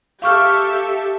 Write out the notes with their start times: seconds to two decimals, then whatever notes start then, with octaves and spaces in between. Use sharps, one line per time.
0.22 G4 A4 E5 F5 C#6 F6